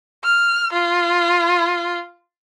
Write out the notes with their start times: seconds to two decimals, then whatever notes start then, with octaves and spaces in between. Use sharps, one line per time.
0.24 F6
0.73 F4